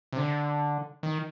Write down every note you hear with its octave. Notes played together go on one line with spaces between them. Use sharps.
C3
D3
D#3